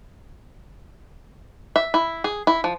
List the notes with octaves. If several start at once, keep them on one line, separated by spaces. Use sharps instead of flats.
E5
E4
G#4
E4
F3